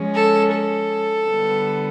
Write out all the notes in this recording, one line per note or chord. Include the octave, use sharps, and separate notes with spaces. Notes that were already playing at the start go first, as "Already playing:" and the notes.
Already playing: F3 G#3 C#4
A4
A4
D3 G3 B3